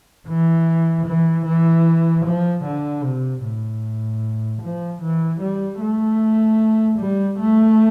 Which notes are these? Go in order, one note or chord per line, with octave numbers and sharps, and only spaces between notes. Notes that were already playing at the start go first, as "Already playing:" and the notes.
E3
E3
E3
F3
D3
C3
A2
F3
E3
G3
A3
G3
A3